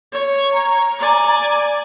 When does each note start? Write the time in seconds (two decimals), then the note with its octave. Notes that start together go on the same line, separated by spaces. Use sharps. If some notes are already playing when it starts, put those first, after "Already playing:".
0.13 C#5
0.52 A#5
0.99 D5 G#5